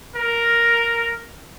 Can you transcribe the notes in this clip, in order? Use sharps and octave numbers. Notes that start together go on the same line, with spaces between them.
A#4